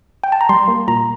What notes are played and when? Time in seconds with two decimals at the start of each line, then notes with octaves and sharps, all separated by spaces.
0.24 G5
0.32 A5
0.41 A#5
0.49 G3 C6
0.68 A#3
0.88 A#2 A#5